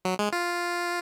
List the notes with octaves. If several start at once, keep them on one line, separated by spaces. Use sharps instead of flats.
F#3
G#3
F4